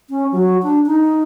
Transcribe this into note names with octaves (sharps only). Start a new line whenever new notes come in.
C#4
F#3
D4
D#4